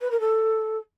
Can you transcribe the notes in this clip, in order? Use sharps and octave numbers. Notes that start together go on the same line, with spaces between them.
B4
A#4
A4